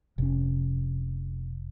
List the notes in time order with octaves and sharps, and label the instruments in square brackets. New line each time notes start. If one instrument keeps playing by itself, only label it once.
[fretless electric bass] F1 [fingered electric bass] C3 C#4